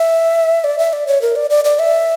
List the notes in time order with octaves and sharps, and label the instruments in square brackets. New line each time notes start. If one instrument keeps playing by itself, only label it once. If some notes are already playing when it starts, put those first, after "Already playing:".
Already playing: [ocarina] E5
D5
E5
D5
C#5
A#4
D5
D5
D5
E5